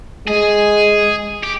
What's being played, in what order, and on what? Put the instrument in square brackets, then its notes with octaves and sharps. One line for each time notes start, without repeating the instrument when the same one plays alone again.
[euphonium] G#3 [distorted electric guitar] G#4
[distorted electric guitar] G4